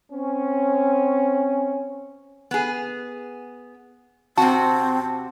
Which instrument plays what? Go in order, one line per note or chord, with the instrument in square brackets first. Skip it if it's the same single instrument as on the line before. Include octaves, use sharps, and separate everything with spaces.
[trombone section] C4 C#4
[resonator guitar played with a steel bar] B3 G#4
[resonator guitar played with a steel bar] C3 F#4 [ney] C4 [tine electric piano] A5